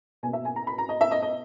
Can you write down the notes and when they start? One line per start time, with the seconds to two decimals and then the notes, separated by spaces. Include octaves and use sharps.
0.23 B2 A#3 G#5
0.33 E5
0.45 G#5
0.56 A#5
0.67 B5
0.78 A#5
0.89 D#5
1.01 E5
1.11 D#5
1.22 D#5